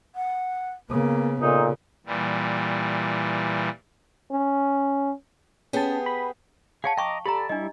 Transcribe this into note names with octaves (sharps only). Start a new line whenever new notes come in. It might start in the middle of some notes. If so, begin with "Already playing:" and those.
F#5
C#3 A#3 B3
A#2 C#3 D#4 A4
A#2 E3 G3
C#4
B3 C#4 G4 G#4 A5
B5
G#4 C#5 F5 F#5 A5
D#5 G5 A#5 C#6 D6
G4 A4 D5 A#5 B5
G3 D4 E4 D#5